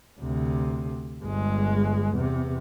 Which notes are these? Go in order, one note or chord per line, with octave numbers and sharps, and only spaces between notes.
D2 C3
G1 G#3
E2 C3